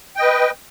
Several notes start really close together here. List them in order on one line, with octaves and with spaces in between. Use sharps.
G5 D#5 B4